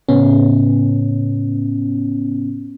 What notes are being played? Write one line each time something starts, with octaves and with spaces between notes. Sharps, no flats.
A2 C#3 B3 C#4